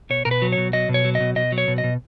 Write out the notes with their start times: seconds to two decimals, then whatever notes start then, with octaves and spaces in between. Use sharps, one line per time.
0.10 B2 C#5
0.25 B2 A#4
0.31 B4
0.42 F#3
0.52 C#5
0.58 B2
0.73 F#3 D#5
0.89 B2
0.94 C#5
1.05 F#3
1.15 D#5
1.20 B2
1.36 B2 D#5
1.52 F#3
1.58 C#5
1.68 B2
1.78 D#5
1.84 B2